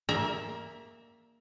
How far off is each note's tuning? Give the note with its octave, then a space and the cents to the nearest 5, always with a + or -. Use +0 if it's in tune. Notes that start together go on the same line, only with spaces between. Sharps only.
A#3 +0 E5 +0 A#5 +30